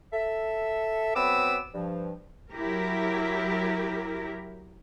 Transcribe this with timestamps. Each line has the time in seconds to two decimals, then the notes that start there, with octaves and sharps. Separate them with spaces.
0.13 A4 E5
1.15 F#3 B3 C4 B5 D6 E6
1.74 G2 F3
2.53 F#3 E4 G4 A#4